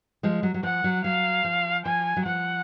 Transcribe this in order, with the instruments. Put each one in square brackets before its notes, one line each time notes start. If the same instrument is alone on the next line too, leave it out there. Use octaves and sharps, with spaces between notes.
[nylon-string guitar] F3 G#3
F#3
F#3
[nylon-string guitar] F3 [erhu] F#5
[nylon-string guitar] F#3
[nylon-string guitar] F#3 [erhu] F5
[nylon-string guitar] F3
[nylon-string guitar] F3 [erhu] G#5
[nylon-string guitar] F#3
[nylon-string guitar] F3 [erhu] F#5